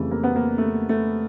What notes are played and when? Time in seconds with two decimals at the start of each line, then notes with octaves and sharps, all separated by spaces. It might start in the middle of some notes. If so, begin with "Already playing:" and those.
Already playing: F2 C#3 E3 G3 A3
0.11 A#3
0.24 B3
0.36 A#3
0.58 A3
0.89 A3